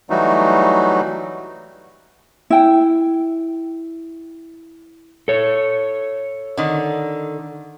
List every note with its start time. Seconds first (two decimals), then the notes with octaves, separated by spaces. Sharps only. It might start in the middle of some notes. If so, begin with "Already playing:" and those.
0.10 E3 F#3 G3 A3 D#4 F#4
2.50 E4 G5
5.28 A4 C#5
6.57 D3 D#3